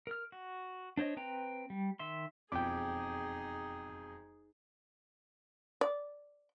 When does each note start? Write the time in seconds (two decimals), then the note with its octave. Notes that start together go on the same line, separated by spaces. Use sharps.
0.07 A#4 F6
0.32 F#4
0.97 D4 C5 C#5 D#5
1.17 C4 B4 G5 A#5
1.70 G3
1.99 D#3 E5 C6
2.52 E1 F2 D#4 G#4 G5 D6
5.81 D5